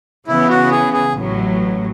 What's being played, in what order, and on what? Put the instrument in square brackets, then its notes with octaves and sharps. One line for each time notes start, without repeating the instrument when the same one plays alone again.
[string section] C#3 E3 B3 [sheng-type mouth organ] E4
[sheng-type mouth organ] F#4
G#4
G#4
[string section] A1 A2 F#3